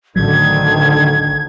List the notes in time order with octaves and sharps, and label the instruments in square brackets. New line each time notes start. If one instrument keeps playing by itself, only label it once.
[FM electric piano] A1 F#3 [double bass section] D2 D3 D#3 [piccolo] G#6